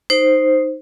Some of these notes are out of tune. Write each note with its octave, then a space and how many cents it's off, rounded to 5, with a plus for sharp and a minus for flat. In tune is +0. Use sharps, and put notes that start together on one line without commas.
D#4 +0 C5 +0